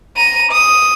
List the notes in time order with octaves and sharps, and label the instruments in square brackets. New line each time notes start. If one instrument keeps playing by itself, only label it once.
[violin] A#5 D#7
D#6